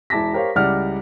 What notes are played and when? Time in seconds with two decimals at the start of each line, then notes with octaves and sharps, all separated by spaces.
0.10 E1 E4 A5 D6 A#6 B6
0.33 G4 A#4 C5 C#5 F5
0.55 C#2 G3 E4 D5 F#5 F6